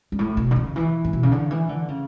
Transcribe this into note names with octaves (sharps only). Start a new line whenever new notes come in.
G2
A2
B2
D3
C#3
E3
A2
B2
C#3
D3
E3
D3
C#3